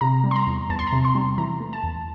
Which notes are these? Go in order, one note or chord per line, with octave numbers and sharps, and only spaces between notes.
C3 A#5
G3
C6
A#5
E2
E2 A5
C6
A#5
C3
C6
G3
E3 A#5
A3
A5
E2